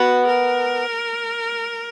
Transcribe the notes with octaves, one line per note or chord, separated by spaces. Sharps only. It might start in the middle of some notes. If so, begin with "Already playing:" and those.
Already playing: B3 F#4
A#4